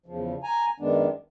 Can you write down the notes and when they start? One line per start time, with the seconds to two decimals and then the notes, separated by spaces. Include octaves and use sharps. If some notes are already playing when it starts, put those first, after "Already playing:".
0.06 E2 C#3 F3
0.43 G#5 A#5
0.80 F#2 D#3 G#3 B3 D4